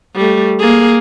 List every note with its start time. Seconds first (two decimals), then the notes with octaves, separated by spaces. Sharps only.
0.16 G3 A3
0.59 A#3 G#4